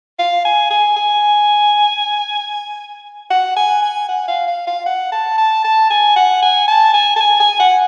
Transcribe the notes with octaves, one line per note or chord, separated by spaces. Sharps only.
F5
G#5
G#5
G#5
F#5
G#5
G#5
F#5
F5
F5
F5
F#5
A5
A5
A5
G#5
F#5
G#5
A5
G#5
A5
G#5
G#5
F#5